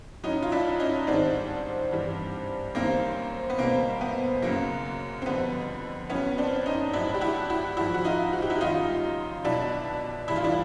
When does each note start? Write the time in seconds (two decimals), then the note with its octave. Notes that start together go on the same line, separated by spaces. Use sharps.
0.23 A2 F#3 C#4 D#4
0.43 F4
0.52 D4 E4
0.80 C#4 D#4
0.96 C#4
1.07 G#2 D#3 G3 C4 D4
1.92 G2 E3 G3
2.75 F#2 D#3 G3 A#3 C4
3.50 B3
3.58 B2 G3 A#3 C4
4.01 B3
4.42 F#2 C#3 F#3 A#3
5.22 C4
5.26 F2 D3 G3 B3
6.10 A2 F#3 B3 C#4
6.38 C4 D4
6.66 C#4 D#4
6.93 A2 F#3 D4 E4
7.14 G4
7.21 E4 F#4
7.50 E4 F#4
7.77 G#2 F3 E4 F#4
7.94 F#4
8.05 D#4 F4
8.33 F#4
8.42 G4
8.50 E4 F#4
8.61 F#2 D#3 G3 D#4 F4
9.44 B2 F#3 D4 E4
10.28 A2 E3 G3 E4
10.36 F4
10.44 D4 E4